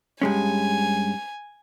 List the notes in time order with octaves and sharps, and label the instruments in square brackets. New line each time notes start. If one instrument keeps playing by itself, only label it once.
[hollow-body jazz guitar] G2 G#3 C#4 [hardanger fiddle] G#5